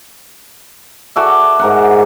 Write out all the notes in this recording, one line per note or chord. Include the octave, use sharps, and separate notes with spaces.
F#4 A4 D5 E5
G#2 A#4 F#5